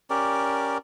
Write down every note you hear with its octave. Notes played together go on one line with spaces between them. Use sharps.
C#4 G4 A#4 D5